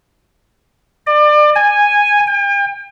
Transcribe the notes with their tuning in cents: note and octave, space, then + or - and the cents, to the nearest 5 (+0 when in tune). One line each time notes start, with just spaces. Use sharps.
D5 +30
G#5 -10
G5 +45